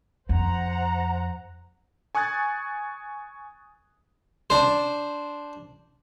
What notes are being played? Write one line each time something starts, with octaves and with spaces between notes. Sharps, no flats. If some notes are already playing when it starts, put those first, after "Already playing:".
F2 C5 F#5 A#5
G#5 C#6 D#6 F#6 G#6 A6
D4 C5